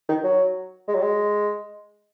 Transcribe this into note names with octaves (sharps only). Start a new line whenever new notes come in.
D#3
F#3
G#3
F#3
G#3